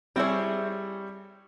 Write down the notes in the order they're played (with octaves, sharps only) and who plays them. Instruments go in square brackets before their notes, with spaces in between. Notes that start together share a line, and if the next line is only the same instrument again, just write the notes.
[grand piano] G3 [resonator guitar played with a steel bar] C4 E4 G#4 C#5